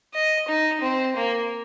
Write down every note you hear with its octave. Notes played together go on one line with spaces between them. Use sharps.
D#5
D#4
C4
A#3